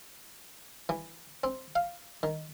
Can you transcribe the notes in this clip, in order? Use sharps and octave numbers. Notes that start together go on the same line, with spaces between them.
E3
C4
F5
D#3